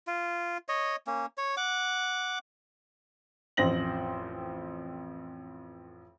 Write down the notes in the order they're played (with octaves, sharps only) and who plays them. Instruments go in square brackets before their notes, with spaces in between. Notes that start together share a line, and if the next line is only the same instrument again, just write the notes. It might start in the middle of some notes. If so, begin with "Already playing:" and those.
[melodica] F4
C#5 D#5
A#3 C#4
C#5
F#5 D6
[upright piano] A1 F2 C5 A#6 F#7